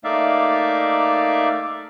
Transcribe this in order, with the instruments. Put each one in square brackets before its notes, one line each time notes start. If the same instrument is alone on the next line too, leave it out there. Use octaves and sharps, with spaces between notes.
[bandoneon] A3 A#3 D#4 D5 E5 F5